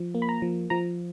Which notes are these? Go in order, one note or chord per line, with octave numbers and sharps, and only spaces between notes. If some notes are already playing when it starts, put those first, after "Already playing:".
Already playing: F3
A#3
B5
A#5
F3
F3 A#5